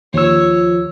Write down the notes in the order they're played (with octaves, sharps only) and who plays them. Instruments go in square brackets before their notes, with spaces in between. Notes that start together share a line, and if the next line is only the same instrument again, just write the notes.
[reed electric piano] D#2 E6 [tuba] F3 [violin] C#5